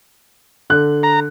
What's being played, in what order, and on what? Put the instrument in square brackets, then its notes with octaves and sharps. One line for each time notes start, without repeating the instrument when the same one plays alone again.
[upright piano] D3 F#6
[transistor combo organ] A#5